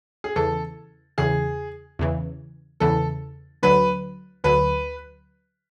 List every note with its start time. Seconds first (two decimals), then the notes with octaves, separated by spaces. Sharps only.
0.24 G#4
0.36 E2 C#3 E3 A4
1.18 E2 C#3 E3 G#4
1.99 E2 C#3 E3
2.80 E2 C#3 E3 A4
3.63 D2 D3 F#3 B4
4.44 D2 D3 F#3 B4